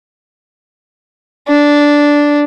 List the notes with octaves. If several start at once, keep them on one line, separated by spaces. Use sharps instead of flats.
D4